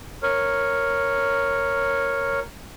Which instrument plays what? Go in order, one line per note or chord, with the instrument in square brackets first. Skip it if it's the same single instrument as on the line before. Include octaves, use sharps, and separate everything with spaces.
[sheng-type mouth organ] A#4 C#5